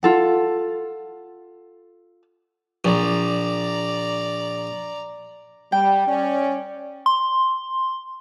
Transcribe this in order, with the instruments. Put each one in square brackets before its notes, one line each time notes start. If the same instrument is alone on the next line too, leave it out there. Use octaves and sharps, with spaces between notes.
[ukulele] F4 A4 F#5
[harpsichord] A#1 [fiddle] D5 A#5
[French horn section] G3 [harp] G5
[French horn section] C#4 D5
[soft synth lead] C6